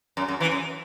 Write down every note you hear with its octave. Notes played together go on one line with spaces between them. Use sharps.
F#2
F#2
E3
F#2